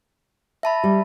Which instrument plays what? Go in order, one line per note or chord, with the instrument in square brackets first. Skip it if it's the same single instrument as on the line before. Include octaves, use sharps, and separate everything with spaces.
[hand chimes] E5 A5 B5
[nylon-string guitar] G3